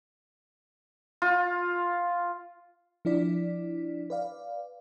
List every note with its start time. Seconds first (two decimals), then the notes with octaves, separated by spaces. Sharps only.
1.22 F4
3.05 F3 D4 E4 D5 B6
4.10 B4 D5 F5